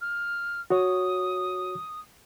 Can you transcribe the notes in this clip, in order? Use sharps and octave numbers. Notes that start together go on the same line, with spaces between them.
F6
F#4 C#5 D#6